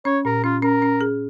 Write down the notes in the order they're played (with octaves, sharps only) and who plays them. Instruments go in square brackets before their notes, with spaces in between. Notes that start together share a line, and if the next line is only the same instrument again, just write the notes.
[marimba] C#4 [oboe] C#5
[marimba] A#2 [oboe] A#4
[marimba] C#4 [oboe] F4
[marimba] C#4 [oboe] A#4
[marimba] C#4
G#4